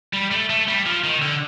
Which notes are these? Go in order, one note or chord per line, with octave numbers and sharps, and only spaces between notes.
G3
A3
A3
G3
F3
D#3
D3